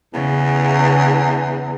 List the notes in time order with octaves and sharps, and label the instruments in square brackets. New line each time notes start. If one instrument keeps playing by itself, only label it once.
[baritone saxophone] E2 [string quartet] C#3